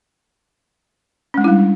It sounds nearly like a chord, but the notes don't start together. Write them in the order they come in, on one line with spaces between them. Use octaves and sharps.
C#4 G#3 D4 E4 G3